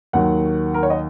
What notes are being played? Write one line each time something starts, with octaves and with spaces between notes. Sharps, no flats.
D#2 D#3 F#3 F#5
A#4
C#5
D#5